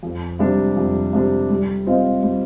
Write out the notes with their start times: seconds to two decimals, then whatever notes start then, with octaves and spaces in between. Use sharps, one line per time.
0.03 F2
0.39 C3 G3 D4 G4
0.77 F2
1.13 C3 G3 D4 G4
1.50 G3
1.87 C4 F4 C5 D#5
2.23 G3